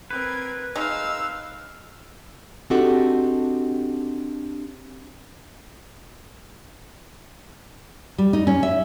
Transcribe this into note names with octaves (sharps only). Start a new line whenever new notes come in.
C4 A#4 B4 G#6
G#3 D#4 F5 E6
C4 D4 D#4 F#4 G4 A4
G3
D#4
C#4
E5